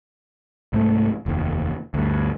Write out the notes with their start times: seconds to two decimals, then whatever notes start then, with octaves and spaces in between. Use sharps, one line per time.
0.73 C2 G#2 A3
1.26 F1 D#2
1.94 D2 G2